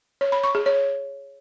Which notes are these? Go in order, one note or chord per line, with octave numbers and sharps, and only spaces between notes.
C#5
B5
C#6
G#4
C#5